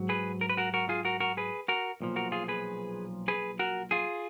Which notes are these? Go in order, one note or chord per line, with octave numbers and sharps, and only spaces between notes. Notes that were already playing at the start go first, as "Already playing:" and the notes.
Already playing: G#2 F#3
G#4 B4
A#4
B4
F#4 A#4
F#4 A#4
F4 G#4
F#4 A#4
F#4 A#4
G#4 B4
F#4 A#4
B1 A#2 F3
F#4 A#4
F4 G#4
G#4 B4
G#4 B4
F#4 A#4
F4 G#4